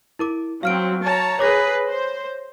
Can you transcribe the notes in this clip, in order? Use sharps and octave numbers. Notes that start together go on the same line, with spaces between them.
E4 A#4 D6
F#3 C4 F5 F6 D7
C#5 A5 A#5
G#4 B4 C#5 D6 A#6
C5